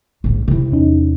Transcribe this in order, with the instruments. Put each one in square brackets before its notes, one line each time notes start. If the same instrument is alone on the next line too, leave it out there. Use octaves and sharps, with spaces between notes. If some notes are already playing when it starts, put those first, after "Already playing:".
[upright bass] A#1 G#2
C3 E4
[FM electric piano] E2 C#4 D#4